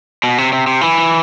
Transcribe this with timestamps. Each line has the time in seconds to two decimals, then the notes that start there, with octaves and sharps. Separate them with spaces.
0.24 B2
0.38 C3
0.53 C3
0.67 C3
0.81 E3